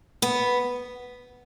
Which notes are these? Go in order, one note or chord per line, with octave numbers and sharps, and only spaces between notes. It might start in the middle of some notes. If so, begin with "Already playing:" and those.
B3